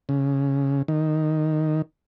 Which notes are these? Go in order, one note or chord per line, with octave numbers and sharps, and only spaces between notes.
C#3
D#3